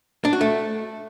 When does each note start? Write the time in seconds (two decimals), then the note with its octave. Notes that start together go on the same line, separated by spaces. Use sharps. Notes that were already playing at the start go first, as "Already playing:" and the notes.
0.25 D4
0.33 F#4
0.41 A3